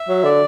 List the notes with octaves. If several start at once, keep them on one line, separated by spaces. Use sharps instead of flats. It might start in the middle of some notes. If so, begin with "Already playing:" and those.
Already playing: E5
F#3
D3 D5